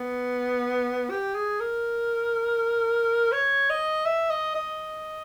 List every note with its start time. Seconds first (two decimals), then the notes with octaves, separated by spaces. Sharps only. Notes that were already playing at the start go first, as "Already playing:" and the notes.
Already playing: B3
1.10 G4
1.35 G#4
1.60 A#4
3.32 C#5
3.70 D#5
4.06 E5
4.30 D#5
4.55 D#5